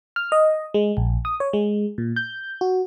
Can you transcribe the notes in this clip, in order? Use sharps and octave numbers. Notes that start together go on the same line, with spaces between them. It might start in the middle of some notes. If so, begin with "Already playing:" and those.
F6
D#5
G#3
A#1
D#6
C#5
G#3
A#2
G6
F#4